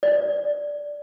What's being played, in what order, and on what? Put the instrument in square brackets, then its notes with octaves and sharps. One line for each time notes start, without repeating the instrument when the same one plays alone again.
[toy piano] D5